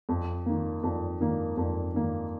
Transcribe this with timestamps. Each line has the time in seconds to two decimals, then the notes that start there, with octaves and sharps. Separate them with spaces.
0.09 F2
0.46 D#3 A#3
0.83 F2
1.21 D#3 A#3
1.57 F2
1.94 D#3 A#3